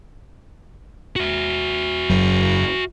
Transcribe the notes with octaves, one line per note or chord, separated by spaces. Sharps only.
F#4 E5
F#1 F#2 F#3